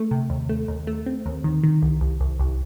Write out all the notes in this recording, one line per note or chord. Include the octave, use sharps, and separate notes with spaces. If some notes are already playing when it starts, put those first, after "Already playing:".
Already playing: A3
C3
D#2
A3
D#2
A3
C4
D#2
D#3
D#3
C2
C2
C2
C2